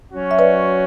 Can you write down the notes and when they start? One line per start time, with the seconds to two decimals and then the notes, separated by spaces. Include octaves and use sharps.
0.11 F#3 C#4 F#4
0.31 E5
0.39 B4 D5